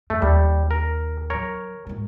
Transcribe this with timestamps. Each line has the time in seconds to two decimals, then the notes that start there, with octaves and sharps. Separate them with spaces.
0.10 F#2 A3
0.22 D#2 G3
0.71 A#4
1.30 D#3 F#3 A#4 C#5
1.87 G#2 G#3